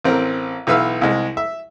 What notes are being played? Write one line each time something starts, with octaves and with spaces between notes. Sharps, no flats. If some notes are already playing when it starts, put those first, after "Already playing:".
A1 C4 A#4
B1 E3 B4 E5 F5 E6
C2 G#3
E5